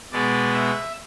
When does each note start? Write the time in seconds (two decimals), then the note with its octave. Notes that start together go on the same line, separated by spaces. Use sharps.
0.12 B2 G#3 B3 D5
0.54 E5